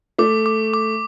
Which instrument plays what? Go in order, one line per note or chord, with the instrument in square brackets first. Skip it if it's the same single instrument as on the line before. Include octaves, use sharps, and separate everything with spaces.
[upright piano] A3 [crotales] D6
[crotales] D6
D6